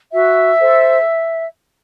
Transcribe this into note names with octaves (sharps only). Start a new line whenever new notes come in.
F#4 E5
A4 C5